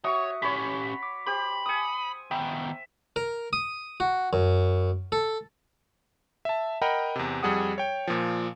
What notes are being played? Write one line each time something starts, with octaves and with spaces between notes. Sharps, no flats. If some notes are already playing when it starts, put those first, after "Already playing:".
F#4 C#5 E5 C#6 D#6
C#4 G4 C#5 B5 B6
D6
G4 C5 B5
G#5 D#6 E6 C#7
D#3 B3 E5 G5
A#4
D#6
F#4
F#2
A4
E5 A5
A#4 D#5 F#5 G5 A#5 B5
E2 C3
F2 G3 G#4 F#5 D#6
C#5 G5
A#2 F3